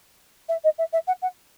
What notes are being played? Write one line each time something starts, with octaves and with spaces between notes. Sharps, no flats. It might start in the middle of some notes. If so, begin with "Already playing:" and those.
E5
D#5
E5
E5
F#5
F#5